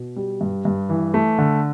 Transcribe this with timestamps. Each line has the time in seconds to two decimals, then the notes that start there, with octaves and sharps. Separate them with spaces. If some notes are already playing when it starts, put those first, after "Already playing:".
Already playing: B2
0.16 G3
0.41 G2
0.65 G2
0.89 E3
1.14 A3
1.38 D3